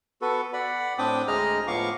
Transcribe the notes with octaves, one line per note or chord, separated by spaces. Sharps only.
B3 F#4 A4 B4
D5 F#5 B5
A2 C4 D4 G5 D6 D#6
D2 G#3 G#4 D#5 A#5 F6
A2 F3 B3 F5 C#6 D6